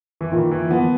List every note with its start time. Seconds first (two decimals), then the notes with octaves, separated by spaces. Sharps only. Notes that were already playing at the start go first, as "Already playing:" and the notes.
0.21 E3
0.32 A#2 D#3
0.51 E3
0.71 F3 B3